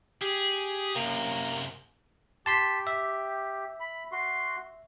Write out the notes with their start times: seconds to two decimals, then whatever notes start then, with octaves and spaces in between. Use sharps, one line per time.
0.21 G4 G#4
0.96 F#2 C3 A#3
2.46 G4 A5 C6 B6
2.87 E5
3.80 B5
4.12 F#4 C6